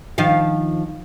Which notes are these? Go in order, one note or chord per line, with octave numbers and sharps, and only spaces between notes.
D#3 F3 F5